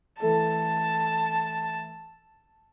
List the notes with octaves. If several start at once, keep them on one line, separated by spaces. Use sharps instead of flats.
E3 A3 A4 A5